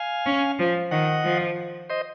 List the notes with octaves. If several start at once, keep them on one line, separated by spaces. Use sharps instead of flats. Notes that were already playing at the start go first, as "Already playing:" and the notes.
Already playing: F5 G#5
C#4
F3
D#3 D#5 F#5
F3
C5 D#5